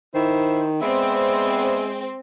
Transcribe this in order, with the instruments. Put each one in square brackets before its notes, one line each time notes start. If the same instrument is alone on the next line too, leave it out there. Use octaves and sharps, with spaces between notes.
[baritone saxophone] D#3 [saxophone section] E4 C5
[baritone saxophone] G#3 [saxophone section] B3 D5 E5 [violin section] C4